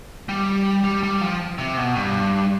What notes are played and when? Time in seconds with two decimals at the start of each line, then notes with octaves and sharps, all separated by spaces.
0.29 G3
0.84 G3
1.03 G3
1.21 F3
1.58 C3
1.77 B2
1.95 G2